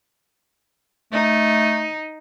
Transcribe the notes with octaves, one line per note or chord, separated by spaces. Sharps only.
A3 D#4